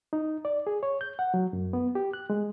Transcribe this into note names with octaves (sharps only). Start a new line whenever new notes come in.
D#4
D5
G#4
C#5
G6
F#5
F#3
F#2
B3
G4
F#6
G#3